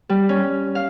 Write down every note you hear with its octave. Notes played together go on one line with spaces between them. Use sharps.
G3
C#4
F5